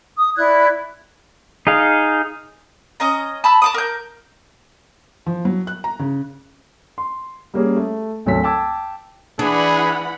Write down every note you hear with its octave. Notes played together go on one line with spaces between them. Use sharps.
D#6
E4 D5 F#6 G#6
D#4 G#4 F5
C#4 D#5 A#5
A5 B5 E6
A5 D6 D#6
A#4 G6
F3
F#3
F#6
A#5
C#3
C6
G3 A#3 C#4 G#4
A3
G#1 D2 F#3 A4 B6
G5 A5 D6 E6 G#6
E3 D4 G#4 F#5 B5